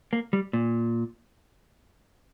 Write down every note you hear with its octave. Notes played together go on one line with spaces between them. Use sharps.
A#3
G3
A#2